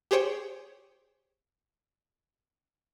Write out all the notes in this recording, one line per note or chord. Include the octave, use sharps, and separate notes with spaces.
G4 G#4 C5 C#5 G5